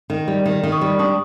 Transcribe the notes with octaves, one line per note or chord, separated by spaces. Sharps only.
D#3
G3
D#3
D#3
C#6 D#6
G3
D4 C#6 D#6